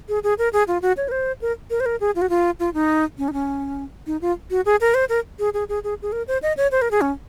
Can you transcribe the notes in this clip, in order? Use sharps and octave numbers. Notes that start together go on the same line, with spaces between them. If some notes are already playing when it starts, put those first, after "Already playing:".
G#4
G#4
A#4
G#4
F4
F#4
C#5
A#4
C5
A#4
A#4
C5
A#4
G#4
F4
F#4
F4
F4
D#4
C#4
D#4
C#4
D#4
F4
F#4
G#4
A#4
C5
A#4
G#4
G#4
G#4
G#4
G#4
A#4
C5
D#5
C#5
C5
A#4
G#4
C#4